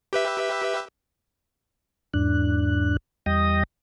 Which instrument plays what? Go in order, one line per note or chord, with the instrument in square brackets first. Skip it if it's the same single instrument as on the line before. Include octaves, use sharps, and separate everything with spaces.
[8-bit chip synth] G4 B4 E5
[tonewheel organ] E2 G#2 D4 F#6
E2 G3 D#5 G5 D#6 A#6